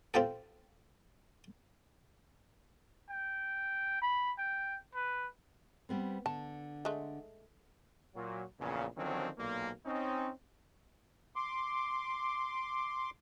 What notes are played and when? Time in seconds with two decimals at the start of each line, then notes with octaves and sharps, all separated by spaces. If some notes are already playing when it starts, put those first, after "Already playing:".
0.14 C4 F4 G4 A4
3.10 G5
4.01 B5
4.38 G5
4.94 B4
5.89 G3 B3 C4
6.26 D3 A5
6.85 G#3 A3
8.15 A#2 F#3
8.60 A#1 E2 A#2 C#3
8.96 D3 D#3 F3 F#3 C4 C#4
9.38 B1 A#2 A#3
9.86 C4 C#4 D#4
11.36 C6 D6